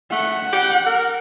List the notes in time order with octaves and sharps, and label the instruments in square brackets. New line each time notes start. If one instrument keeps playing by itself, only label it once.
[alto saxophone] A3 [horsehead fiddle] F#5
[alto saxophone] G4
A#4